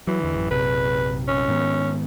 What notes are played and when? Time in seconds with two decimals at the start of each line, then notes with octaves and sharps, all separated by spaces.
0.07 E3 F#3
0.21 E2 D3
0.35 A1 F#2
0.51 A#1 F#2 C3 B4
1.28 C#4
1.48 G#2 D#3 B3